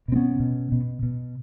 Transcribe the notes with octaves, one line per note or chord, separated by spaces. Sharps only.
B2 C4
B3 C#4
B2
B2
B2